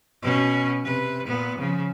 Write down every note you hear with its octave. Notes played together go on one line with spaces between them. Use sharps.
B2 C#4
C3 B4
A#2 B3
C#3 F3